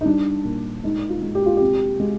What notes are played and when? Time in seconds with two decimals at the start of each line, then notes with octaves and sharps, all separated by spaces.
0.01 D#4
0.05 G3 D4
0.44 A#2
0.84 G#3 D#4
1.09 F4
1.22 G#3
1.35 G4
1.46 F4
1.57 C3 G4
2.00 G#3